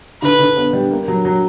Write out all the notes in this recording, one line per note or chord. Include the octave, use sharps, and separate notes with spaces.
D3 B4
D3
B3
G3
A#3
F#3
F#3